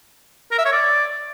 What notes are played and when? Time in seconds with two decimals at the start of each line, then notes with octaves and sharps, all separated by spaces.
0.51 A#4
0.58 E5
0.65 C#5
0.72 D5